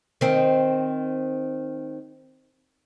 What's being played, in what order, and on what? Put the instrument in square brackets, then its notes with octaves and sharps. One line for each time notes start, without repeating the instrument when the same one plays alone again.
[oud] D#3 C4